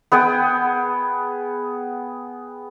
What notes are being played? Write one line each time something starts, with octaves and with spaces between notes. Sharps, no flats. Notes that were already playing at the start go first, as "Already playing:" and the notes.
B3 G#4 F#5 G5